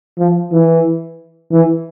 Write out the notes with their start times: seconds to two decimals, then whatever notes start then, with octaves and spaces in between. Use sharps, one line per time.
0.19 F3
0.52 E3
1.52 E3